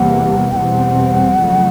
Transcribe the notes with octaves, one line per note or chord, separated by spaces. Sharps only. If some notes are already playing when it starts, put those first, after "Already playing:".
Already playing: E2 C3 E3 G3 A#3 F#5
G5
E2 B2 G3 C4 F#5
F2 C#3 F#3 A3